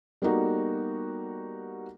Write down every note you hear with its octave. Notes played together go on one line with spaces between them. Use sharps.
G3 A#3 B3 D#4 F#4 A4